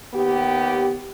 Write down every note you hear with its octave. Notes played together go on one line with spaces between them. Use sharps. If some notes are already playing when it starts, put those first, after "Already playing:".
D#2 B3 G4